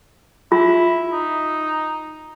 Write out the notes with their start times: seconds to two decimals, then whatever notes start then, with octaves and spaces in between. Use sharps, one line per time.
0.52 E4 F4
1.13 D#4